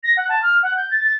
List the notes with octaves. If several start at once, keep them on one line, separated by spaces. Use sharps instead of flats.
A#6
F#5
A5
F6
F#5
G6
A6
A6